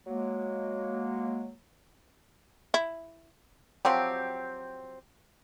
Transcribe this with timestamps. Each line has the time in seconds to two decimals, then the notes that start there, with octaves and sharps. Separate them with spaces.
0.07 F#3 G#3 A#3
2.74 E4
3.85 F3 F#3 C4 G4